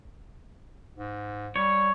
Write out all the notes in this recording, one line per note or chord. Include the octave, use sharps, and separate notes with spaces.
G#2
G3 C#5